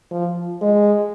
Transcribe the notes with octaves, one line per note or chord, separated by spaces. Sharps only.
F3
G#3